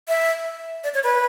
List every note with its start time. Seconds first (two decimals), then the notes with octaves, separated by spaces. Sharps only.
0.08 E5
0.84 D5
0.94 C#5
1.04 B4